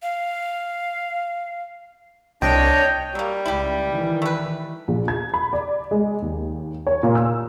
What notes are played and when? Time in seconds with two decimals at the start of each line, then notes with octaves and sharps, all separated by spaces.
0.02 F5
2.42 C2 D4 C#5 D#5 G5
3.15 F#3 G3 A#3
3.46 C#2 E4 G4
3.91 D#3 E3
4.22 A3 B4
4.88 A#1
5.08 G#6
5.34 B5
5.53 D5
5.91 G#3
6.22 D#2
6.87 C#5
7.03 A#2
7.15 E6